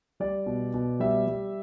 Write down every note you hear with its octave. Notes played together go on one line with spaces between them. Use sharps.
G3 D5
B2
B2
G3 E5
G3